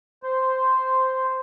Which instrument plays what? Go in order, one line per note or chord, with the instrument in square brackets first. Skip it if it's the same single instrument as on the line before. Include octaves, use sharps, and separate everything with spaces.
[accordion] C5